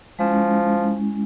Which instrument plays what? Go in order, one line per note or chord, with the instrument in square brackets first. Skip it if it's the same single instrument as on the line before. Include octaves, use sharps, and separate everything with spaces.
[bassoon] F3 [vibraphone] G#3 C#4 E4